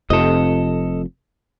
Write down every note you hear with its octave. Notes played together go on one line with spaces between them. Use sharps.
F1 F2 C3 A4 D#5